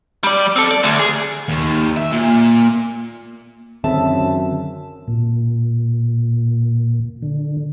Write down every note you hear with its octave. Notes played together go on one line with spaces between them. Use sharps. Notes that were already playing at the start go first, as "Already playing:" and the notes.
G3 D5
C4 A4
D5
D2
G#4
D#2
E5
A#2
F#2 D3 D#3 C4 G#4 E5 A5
A#2
D3